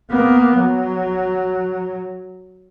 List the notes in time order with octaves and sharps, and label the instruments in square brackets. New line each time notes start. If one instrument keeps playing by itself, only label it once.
[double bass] A#3 B3
F#3